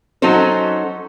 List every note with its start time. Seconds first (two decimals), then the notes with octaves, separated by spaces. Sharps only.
0.22 F#3 C#4 D#4 F#4 A4 C5